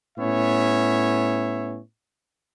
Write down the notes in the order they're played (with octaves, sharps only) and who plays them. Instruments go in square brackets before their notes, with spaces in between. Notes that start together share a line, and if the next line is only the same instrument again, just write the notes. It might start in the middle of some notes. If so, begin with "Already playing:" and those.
[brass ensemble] A2 B3 C#4 C#5 E5